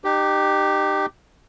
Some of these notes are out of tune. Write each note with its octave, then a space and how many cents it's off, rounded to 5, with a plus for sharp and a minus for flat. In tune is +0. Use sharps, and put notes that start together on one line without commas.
D#4 -35 G4 +0